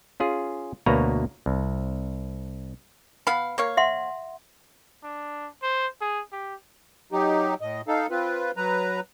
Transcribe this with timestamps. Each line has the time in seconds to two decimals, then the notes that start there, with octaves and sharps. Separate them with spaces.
0.20 C#4 F4 G#4
0.86 D2 B2 A#3 B4 C#5 A#5
1.46 C2
3.27 B3 F5 G#5 B5
3.58 A#3 C#5 F5
3.77 E5 F#5 C6
5.03 D4
5.62 C5
6.01 G#4
6.32 G4
7.12 F#3 D#4 G4
7.61 A2 D#5
7.88 D#4 A4 F5
8.10 C4 F4 B4
8.57 F#3 B4 A#5